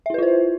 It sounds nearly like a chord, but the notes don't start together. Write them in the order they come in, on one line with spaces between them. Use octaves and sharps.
E5 E4 B4 F4 C5